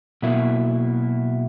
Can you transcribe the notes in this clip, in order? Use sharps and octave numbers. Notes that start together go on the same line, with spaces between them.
B2 F#3 A#3 E4